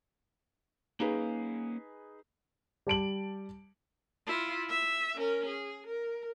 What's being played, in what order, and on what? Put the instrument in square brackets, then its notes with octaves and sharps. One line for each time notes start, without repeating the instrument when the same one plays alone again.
[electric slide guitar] A#3 C#4 F5 [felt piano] D#4 G#4 B4
[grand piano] G3 A5 D7 F#7
[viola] E4 F4
E5
C#4 A#4
G#4
A#4